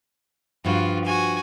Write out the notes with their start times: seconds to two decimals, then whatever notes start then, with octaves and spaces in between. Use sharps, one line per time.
0.65 G2 F3 F4 F#4 B4
1.05 F#4 G#5